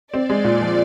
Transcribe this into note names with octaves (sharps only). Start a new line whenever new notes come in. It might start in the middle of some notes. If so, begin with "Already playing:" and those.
C4 D5
G#3
A#2
F3